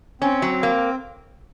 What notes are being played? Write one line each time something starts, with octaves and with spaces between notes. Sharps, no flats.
C4 C#4
F#3
A#3